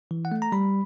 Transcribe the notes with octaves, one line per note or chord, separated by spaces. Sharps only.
E3
F#5
A3
A#5
G3 B5